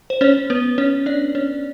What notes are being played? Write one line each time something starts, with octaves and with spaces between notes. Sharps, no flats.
C5
C#4 C#5
B3 B4
C#4 C#5
D4 D5
C#4 C#5